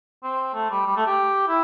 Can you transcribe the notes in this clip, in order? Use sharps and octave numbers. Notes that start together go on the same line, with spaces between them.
C4
A3
G3
G3
A3
G4
E4